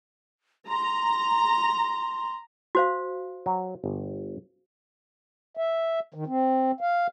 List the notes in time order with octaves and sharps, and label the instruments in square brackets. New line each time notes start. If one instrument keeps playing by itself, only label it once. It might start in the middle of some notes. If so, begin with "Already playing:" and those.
[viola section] A#5 [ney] C6
[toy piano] F#4 C5 F5
[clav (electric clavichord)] F#3
G1
[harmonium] E5
D#3
C4
F5